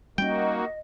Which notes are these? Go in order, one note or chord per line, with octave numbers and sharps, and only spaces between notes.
G3 A#3 B3 C#4 D#4 F#4 D#5 G5